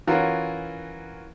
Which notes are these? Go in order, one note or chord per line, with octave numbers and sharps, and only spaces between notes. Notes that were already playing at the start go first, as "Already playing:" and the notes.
E3 C#4 F4 F#4 A#4